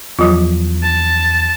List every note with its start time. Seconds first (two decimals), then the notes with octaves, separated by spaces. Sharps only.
0.19 E2 F3 F#3 F4
0.83 A5